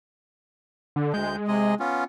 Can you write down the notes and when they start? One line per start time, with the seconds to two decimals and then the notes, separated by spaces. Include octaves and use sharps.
0.96 D3
1.14 D2 G#3 G6
1.48 C3 G#4 D#5
1.79 B3 C#4 F4